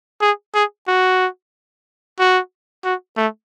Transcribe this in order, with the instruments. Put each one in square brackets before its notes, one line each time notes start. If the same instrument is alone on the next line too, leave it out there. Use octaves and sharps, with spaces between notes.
[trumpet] G#4
G#4
F#4
F#4
F#4
A3